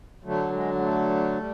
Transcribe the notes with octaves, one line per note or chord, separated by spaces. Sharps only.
D3 F#3 A3
G#3
G#3
A3
G3